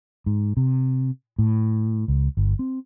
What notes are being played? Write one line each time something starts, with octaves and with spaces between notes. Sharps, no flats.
G#2
C3
A2
C#2
G1
C4